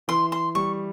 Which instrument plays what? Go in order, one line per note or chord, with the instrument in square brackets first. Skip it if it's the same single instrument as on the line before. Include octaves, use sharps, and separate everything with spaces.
[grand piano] E3 [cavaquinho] C6
[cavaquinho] C6
[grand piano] G3 [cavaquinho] C#6